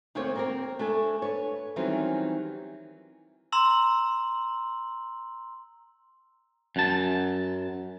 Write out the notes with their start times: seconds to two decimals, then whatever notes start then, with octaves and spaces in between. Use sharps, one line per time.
0.15 D2 A3 A#3 C4 C5 C#5
0.36 A#3 C4 A#4
0.79 A3 D4 A4 G#5
1.22 B4 C#5
1.76 D#3 E3 F#3 G3 C4 C#4
3.52 A#5 C6 E6 F#7
6.76 F#2 A5